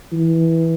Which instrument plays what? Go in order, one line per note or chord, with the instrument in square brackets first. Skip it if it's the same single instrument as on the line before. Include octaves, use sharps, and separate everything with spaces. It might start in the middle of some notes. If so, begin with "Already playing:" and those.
[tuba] E3